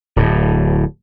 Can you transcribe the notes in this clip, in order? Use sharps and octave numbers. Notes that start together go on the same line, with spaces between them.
D1 A2